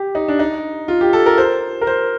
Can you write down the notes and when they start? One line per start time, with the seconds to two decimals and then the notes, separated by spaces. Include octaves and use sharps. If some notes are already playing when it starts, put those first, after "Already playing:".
Already playing: G4
0.15 D#4
0.28 D4
0.39 D#4
0.88 F4
1.01 G4
1.13 A4
1.26 A#4
1.38 C5
1.81 A#4
1.87 C5